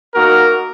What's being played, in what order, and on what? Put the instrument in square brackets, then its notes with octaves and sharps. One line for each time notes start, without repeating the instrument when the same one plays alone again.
[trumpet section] A#3 D#4 F#4 A#4